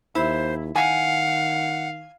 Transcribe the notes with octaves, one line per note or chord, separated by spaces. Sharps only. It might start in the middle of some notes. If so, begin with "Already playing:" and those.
D#2 E4 C5
D#3 F5 F#5 G#5